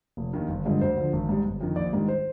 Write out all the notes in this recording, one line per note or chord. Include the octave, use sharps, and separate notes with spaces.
F1
D#2 D#3
G1
G2 D3 F3 G#3
D2 C5
D3 F3
G#1
G#2 G3
G1
F2 D#3
A#1 D5
G#2 D#3 G3
C5